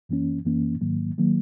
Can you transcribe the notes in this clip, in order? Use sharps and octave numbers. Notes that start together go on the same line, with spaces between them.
F#2 E3 A#3 C#4
F#2 E3 A#3 C#4
G#2 D#3 F#3 A#3
D#3 F#3 A#3